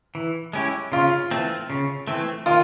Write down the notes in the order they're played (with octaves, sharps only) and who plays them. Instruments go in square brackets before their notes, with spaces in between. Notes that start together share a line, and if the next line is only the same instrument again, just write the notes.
[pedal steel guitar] E3
G#3 C#4 E4 G4
[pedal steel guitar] C#3 [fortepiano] F4
[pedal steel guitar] E3 A3 C4
C#3
E3 A3 C4
[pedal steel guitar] D#3 [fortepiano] F4